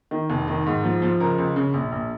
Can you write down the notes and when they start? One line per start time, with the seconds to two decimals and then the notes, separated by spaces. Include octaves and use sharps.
0.11 D#3
0.30 F1
0.48 D#3
0.66 G#2
0.84 F3
1.02 F3
1.20 C#2 A#4
1.38 C#2
1.56 C#3
1.74 A#1
1.92 A#1